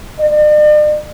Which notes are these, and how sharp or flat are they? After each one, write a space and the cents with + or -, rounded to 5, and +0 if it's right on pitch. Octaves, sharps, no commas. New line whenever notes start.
D5 +45